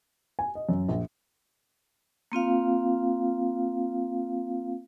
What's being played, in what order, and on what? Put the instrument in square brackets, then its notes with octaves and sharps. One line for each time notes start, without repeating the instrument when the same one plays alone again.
[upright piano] G#5
D#5
F#2
A#1
[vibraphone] A#3 C4 F4 F5